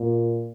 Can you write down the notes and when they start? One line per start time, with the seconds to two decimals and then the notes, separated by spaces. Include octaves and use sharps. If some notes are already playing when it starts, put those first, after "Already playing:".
Already playing: A#2